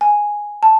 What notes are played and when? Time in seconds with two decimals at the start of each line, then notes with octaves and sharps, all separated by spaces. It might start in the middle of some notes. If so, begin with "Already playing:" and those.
0.01 G#5
0.63 A5